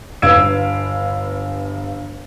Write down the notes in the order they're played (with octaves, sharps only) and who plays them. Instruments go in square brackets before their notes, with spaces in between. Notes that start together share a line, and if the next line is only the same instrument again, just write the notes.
[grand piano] G1 B4 F5 E6 G#6 D7